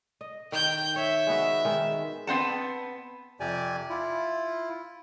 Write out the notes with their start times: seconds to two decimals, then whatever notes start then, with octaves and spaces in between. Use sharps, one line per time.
0.21 D#5
0.52 D#3 G5 G6
0.96 C#5 E5
1.27 G#3 B3 F#4
1.65 D#3 G#3
2.27 B3 C4 F#5 A5
3.40 F2 C3 G4 D5 G#5
3.90 E4 F4